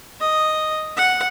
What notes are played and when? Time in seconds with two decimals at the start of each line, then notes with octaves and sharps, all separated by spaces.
0.20 D#5
0.97 F#5